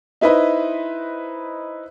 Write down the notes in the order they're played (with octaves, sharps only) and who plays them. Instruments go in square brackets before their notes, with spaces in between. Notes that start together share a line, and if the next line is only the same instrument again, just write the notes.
[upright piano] D#4 E4 B4 C5 D#5